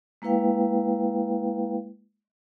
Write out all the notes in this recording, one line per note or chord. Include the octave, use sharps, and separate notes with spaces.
G#3 A#3 E4 B4 F5 G5